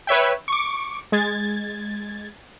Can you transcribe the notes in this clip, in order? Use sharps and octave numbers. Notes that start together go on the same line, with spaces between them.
B4 C#5 E5 G5
C#6 D6
G#3 G#6 A6